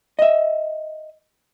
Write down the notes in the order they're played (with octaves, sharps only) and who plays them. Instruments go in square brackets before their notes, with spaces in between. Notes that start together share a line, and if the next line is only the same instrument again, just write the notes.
[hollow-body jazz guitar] D#5 E5